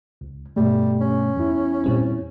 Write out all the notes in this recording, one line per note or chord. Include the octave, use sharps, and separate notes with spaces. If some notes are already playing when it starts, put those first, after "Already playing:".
C#2
G2 B2 G3 A3
C#4
E2 E4
A#2 G3 C4